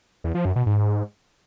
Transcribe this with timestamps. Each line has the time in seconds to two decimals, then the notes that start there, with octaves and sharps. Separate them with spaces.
0.24 E2
0.35 F3
0.45 F#2
0.56 B2
0.66 G#2